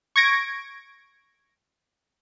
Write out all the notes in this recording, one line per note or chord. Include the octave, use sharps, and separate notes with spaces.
C#6 G#6 A#6 D7